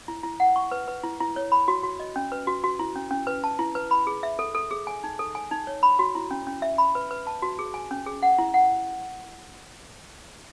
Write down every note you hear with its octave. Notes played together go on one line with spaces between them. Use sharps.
E4
E4
F#5
C#6
B4
B4
E4
E4
C#5
B5
F#4
F#4
D#5
C#4
B4
F#4
F#4
E4
C#4
C#4
B4
A5
E4
B4
B5
G#4
E5
A4
A4
G#4
G#5
D#4
A4
G#5
D#4
C#5
B5
F#4
E4
C#4
C#4
E5
B5
B4
B4
A5
F#4
G#4
G#5
C#4
G#4
F#5
E4
F#5